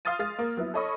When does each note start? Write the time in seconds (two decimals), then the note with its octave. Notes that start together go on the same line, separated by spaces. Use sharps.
0.05 F5 C6 D#6 F6 A6 D#7
0.19 G#3 F5 F6 A6
0.39 A#3
0.57 F#3 B3 E4
0.74 A4 C#5 D#5 B5 C#6 D#6